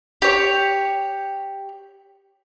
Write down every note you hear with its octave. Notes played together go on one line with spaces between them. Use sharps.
G4 C#5